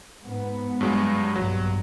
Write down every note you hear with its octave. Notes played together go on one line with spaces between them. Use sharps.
G#2 B3
G2 F#3 G#3
A#1 G2 B2 F#3